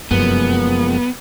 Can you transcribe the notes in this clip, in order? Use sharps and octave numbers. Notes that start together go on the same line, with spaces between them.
F1 F#2 F3 G#3 A#3 B3